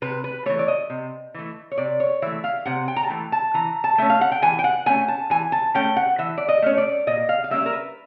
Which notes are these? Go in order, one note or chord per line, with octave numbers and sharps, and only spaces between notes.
C3 B4
B4
E3 A3 C#5
D5
D#5
C3
E3 A3
C#5
C3 D5
C#5
E3 A3 E5
F5
C3 F#5
G5
A#5
A5
E3 A3
A5
E3 A#5
A5
A3 C#4 E5
F5
F#5
G5
E3 G#5
G5
F#5
A3 C#4 G#5
A5
E3 G#5
A5
A3 C#4 G5
F#5
E3 E5
D5
D#5
A3 C#4 C#5
D5
A#2 D#5
F5
F5
G3 A#3 C#4 E5
A#4
B4